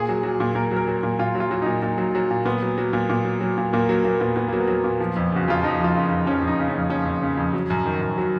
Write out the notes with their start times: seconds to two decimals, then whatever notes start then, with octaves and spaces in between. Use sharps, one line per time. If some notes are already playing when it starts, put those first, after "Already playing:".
Already playing: A#2 G#4
0.08 F#3
0.23 F#3
0.40 A#2
0.55 A#2 A#4
0.71 F#3
0.77 A#4
0.88 F#3
1.03 A#2
1.19 A#2 F4
1.35 F#3
1.40 F4
1.51 F#3
1.62 A#2 D#4
1.82 A#2
1.98 F#3
2.15 F#3
2.31 A#2
2.45 A#2 B3
2.62 F#3
2.78 F#3
2.93 A#2
3.10 A#2
3.25 F#3
3.41 F#3
3.58 A#2
3.73 A#2 A#3
3.89 F#3
4.04 F#3 A#3
4.20 A#2 B3
4.36 A#2 B3
4.48 F#3 A#3
4.60 B3
4.67 F#3
4.84 A#2
5.00 F3
5.16 F2
5.32 C#3 F#4
5.48 F2 F4
5.63 F3 D#4
5.80 F2 F4
5.95 C#3
6.06 F2 D#4
6.26 F3 C#4
6.42 F2
6.47 D#4
6.59 C#3
6.69 F2 C#4
6.90 F3 C#4
7.06 F2
7.22 C#3
7.37 F2
7.53 F#3
7.70 F#2
7.86 D#3
8.01 F#2
8.18 F#3